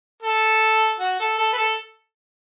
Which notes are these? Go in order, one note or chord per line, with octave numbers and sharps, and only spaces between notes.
A4
F#4
A4
A4
B4
A4